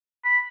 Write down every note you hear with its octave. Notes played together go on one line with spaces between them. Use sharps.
B5